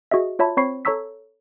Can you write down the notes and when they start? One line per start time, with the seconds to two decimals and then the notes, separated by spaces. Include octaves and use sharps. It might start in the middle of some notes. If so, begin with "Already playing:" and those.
0.11 F#4 G#4 D#5 E5
0.39 F4 C#5 E5 A5 B5
0.57 C4 C5 C#5 B5 C#6 C7
0.85 A4 C#5 A#5 C#6 E6 B6